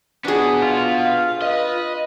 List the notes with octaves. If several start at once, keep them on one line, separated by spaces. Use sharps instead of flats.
B3 D4 F#4 G#4
F4
F5
B4 D#5